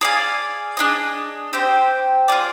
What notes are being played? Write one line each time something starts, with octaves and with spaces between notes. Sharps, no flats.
G#4 D5 F5 G#5
D4 G#4 D#5
C4 G4 C5 G5
F4 G#4 D5